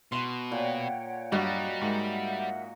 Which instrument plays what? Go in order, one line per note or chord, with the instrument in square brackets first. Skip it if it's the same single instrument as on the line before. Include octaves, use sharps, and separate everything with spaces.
[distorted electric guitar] B2 [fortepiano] C6
[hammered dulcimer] A#2 [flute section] C#5 F#5 G5
[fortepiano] G2 [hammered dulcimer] F#3 F#4 D#5 [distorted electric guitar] G3
[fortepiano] G#2 [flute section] A#4 E5 F#5